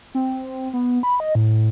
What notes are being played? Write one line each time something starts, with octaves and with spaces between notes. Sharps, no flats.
C4
B3
B5
D#5
A2